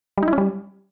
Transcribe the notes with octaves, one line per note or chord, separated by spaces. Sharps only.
G3
D#4
E4
C#4
G3